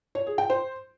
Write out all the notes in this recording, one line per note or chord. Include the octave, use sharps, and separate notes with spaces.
C#5
G#4
G5
C5